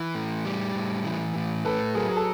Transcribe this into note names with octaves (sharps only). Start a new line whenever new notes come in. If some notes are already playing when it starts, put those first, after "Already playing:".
Already playing: E3
A2
G3
A2
E3
A2
A3 A4 B4
F#3 G#4 A#4
G#4
A4